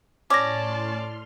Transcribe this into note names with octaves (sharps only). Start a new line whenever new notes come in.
A2 C#4 D5 A5 C6 D6 F6 A#6